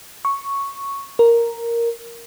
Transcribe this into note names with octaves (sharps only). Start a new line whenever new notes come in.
C#6
A#4